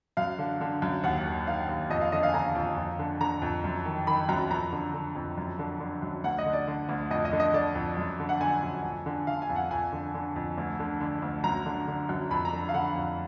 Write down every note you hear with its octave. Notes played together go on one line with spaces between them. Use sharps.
F#2 F5
D3
D3
F#2
D#2 F#5
D#3
D#3 F5
D#2
F2 D#5
F5
D3 D#5
F5
G#5
D3 A#5
F2
F2
D3
D3 A#5
F2
F#2
D#3
D#3 B5
F#2 A#5
F2 A#5
D3
D3
F2
F#2
D3
D3
F#2
D2 F#5
D#5
D3
D5
D3
D2
F2 D#5
D#5
D3
D#5
D3 D5
F2
F#2
D3
F#5
D3 G#5
F#2
F2
D3
D3 F5
G#5
F2
F#5
F2 G#5
D3
D3
F2
D2
D3
D3
D2
F#2 A#5
D3
D3
F#2
F2 B5
A#5
D3
F5
D3 F#5
F2